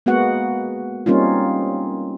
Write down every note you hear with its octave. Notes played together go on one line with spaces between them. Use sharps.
G#3 A#3 B3 F#4 F#5
G3 A#3 C4 C#4 D#4 F4